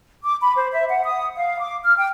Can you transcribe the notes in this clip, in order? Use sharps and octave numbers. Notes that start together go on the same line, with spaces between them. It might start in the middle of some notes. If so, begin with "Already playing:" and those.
D6
B5
C5
E5
F#5
D#6
F5
D6
F6
G5